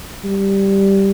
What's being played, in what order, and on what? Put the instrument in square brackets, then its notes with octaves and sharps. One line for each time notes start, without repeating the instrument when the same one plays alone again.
[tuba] G3